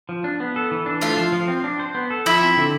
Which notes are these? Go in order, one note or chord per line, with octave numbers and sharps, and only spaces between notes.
F3
D4
B3
A4
E3
D4
A3 F4 F5
F3
F3
C4
D4
C5
B3
A4
F3 E4 E5
C4
D3